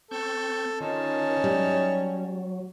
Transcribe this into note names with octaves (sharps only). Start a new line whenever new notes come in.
C4 A4 C#6 G6
D#3 C#4 D#4 F4 A5
F#3 G3